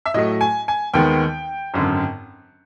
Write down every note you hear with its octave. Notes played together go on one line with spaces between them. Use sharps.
E5
A2 F#3 A3 D#5
G#5
G#5
D#2 D#3 G#3 B3 G5
G#1 F#2 D3